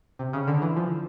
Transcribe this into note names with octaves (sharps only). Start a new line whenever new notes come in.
C3
C#3
D3
E3
F3